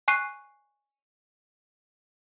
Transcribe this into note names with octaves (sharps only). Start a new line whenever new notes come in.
G#5 C#6 F#6 C7 D#7